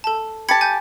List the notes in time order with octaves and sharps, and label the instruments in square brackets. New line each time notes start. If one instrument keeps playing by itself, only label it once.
[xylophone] A4 A5
[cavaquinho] G4 A5 [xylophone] B5 G#6 C#7
[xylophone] G#5 G6